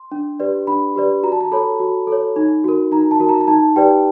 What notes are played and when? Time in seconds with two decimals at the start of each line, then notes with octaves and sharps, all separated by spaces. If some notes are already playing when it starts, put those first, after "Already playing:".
Already playing: C6
0.12 D4
0.40 G4 B4 D5
0.67 D4 B5
0.96 G4 B4 D5
1.23 F#4 A#5
1.32 A5
1.41 A#5
1.52 A4 C#5 B5
1.80 F#4
2.07 A4 C#5
2.36 D#4
2.64 F#4 A#4
2.92 D#4 A#5
3.11 A5
3.20 F#4 A#4
3.29 A#5
3.41 A#5
3.48 D#4 A5
3.76 G4 B4 D5 G5